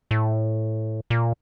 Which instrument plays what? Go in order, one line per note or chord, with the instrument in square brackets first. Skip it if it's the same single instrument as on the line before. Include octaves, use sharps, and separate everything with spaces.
[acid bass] A2
A#2